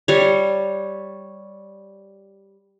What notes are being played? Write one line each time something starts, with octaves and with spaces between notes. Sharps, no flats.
G3 C#5